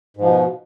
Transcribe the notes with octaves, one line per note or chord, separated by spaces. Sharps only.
G#2 B2 F3